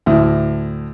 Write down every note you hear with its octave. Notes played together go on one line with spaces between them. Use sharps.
D2 A2